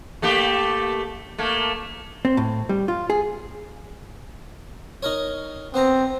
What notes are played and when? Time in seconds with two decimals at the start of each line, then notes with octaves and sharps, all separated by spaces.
0.22 A3 A#3 G4
1.38 A3 A#3
2.25 C4
2.37 A2
2.69 G3
2.88 F4
3.10 G#4
5.03 D#4 A#4 C#5
5.74 B3 C4 C5 A#5